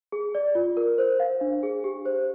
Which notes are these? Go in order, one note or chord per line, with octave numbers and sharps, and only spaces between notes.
G#4
D5
F4
A#4
C5
F5
D4
G#4
G4
C5